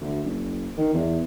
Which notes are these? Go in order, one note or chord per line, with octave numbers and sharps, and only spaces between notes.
D2
F#1
D#3
E2